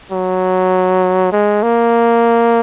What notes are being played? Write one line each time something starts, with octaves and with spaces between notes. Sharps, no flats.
F#3
G#3
A#3